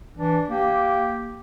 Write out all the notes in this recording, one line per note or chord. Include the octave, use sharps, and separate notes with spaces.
E3 D4
A#3 G4